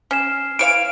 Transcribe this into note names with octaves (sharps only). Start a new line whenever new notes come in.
C#4 F6 C7 E7
E3 C#5 F5 D7